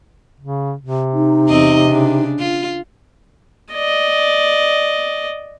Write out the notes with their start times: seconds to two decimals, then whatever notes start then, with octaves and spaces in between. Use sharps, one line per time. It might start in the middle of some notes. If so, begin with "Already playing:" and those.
0.40 C#3
0.81 C3
1.14 D#4
1.48 E2 C4 D#5
1.87 C#3 D4
2.39 F4
3.73 D5 D#5